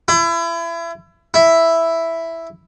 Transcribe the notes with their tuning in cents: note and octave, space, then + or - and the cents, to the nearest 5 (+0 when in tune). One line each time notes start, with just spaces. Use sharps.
E4 +30
E4 +0